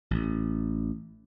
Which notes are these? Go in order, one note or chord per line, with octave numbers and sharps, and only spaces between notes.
A1